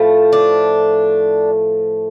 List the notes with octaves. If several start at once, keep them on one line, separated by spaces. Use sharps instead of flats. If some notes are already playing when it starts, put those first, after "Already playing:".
Already playing: A2 F3 A3
D4